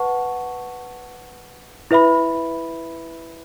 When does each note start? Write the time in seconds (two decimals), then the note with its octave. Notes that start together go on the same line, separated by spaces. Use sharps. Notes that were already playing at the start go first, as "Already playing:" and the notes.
Already playing: B4 F#5 A5 C#6
1.91 E4 B4 E5 B5